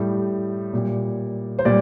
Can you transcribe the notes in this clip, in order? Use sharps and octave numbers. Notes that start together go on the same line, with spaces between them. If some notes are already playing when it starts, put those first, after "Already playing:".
Already playing: A2 G3
A#2 G3
C5
A#2 G3 D5